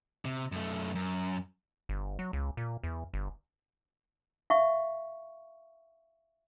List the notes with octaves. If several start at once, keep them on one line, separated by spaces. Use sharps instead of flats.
C3
F#2 A3
F#2
G1
F#3
C#2
A#2
E2
G1
E5 F5 C#6